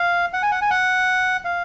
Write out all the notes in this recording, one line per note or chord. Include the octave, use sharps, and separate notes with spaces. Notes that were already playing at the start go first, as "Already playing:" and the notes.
Already playing: F5
F#5
G#5
F#5
G#5
F#5
F5